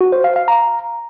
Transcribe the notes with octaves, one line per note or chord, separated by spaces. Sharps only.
F#4
C5
F5
F5
A#5